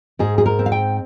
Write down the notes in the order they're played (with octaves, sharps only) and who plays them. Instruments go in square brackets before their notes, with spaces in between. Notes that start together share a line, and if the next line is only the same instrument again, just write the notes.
[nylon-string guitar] G#2 G#4
G#4
A#4
C4
F5
G5